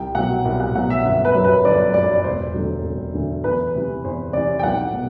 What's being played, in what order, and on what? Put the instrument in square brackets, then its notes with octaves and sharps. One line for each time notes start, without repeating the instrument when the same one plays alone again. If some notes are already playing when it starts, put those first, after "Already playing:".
Already playing: [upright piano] C2 G5
B2 F#3 F#5
C2
F#5
B2 F#3 F#5
E5
G1
B4
F#2 F#3
B4
G1 D5
F#2 F#3 D5
D5
E1 C5
D2 D3 F#3
E1
D2 D3 F#3
E2 B4
C3 E3
E2 C5
C3 E3 D5
G5
B1 F#5
B2